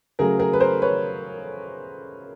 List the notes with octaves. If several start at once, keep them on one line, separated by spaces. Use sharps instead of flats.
C#3 F#3 A3 G#4 A#4
G#4 A#4
B4
A#4 C5
B4 C#5